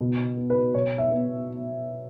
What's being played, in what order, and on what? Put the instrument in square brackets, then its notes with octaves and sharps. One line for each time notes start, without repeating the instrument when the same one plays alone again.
[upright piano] B2
B3
B4
B2 C#5
E5
B3